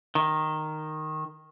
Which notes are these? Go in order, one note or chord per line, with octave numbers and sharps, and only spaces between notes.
D#3